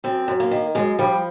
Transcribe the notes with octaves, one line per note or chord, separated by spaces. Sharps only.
F#2 C4
F#2
A#3
D#3
F#2 G#3
F3 G3